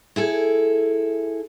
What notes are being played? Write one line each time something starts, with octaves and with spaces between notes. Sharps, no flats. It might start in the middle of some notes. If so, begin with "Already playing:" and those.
E4 G#4 A4